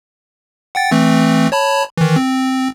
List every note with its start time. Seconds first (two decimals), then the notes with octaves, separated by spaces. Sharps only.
0.75 F#5 G5 A6
0.91 E3 A3 C4
1.52 C#5 A5 B5
1.97 D#3 E3
2.16 C4